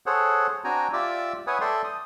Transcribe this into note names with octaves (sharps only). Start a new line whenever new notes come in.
G#4 A4 C5 C#5 F#5
C4 D4 F#4 G5 G#5 A#5
F4 G4 D5 E5 D6 E6
B4 C#5 E5 F#5 G#5 D#6
A4 D5 E5 G5 C6
D#6